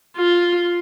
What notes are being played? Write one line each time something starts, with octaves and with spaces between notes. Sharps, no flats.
F4